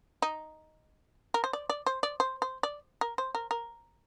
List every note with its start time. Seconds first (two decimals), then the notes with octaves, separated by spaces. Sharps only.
0.22 D#4
1.34 A#4
1.44 C5
1.53 D5
1.69 D5
1.86 C5
2.03 D5
2.20 C5
2.42 C5
2.63 D5
3.01 A#4
3.18 C5
3.35 A#4
3.51 A#4